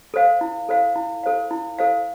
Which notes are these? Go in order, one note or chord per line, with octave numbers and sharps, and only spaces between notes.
A4 C5 F5
E4
A4 C5 F5
E4
A4 C5 F5
E4
A4 C5 F5